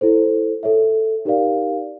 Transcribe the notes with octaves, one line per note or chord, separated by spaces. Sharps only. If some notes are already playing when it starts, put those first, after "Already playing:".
E4 A4 C5
A4 C#5 E5
D#4 G4 A#4 D5 F5